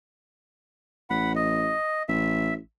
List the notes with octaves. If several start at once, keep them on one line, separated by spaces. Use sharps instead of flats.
A1 F#5 B5
D#5
A1 E5